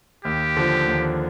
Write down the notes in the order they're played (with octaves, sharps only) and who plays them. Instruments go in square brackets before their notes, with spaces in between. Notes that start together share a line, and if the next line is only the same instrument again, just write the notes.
[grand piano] D#2 [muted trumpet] G4
[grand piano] D3 F3
D#2